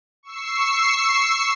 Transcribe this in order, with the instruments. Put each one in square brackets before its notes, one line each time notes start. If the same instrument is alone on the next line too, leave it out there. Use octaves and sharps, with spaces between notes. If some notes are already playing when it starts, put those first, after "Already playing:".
[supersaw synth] C#6 E6 C7